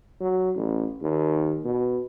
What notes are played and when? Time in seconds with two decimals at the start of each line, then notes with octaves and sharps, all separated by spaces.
0.21 F#3
0.56 A1
1.02 D#2
1.65 B2